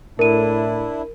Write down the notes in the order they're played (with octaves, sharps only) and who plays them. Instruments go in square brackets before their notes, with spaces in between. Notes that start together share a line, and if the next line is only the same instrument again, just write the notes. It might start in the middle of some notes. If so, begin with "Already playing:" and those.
[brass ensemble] A2 [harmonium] D4 E4 [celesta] A#4 D#7